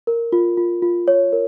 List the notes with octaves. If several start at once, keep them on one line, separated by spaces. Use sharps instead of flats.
A#4
F4
F4
F4
C#5
A#4